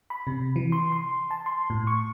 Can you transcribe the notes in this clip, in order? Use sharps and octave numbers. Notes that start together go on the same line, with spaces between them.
B5
C3
E3
C6
C6
A5
C6
A2
C#6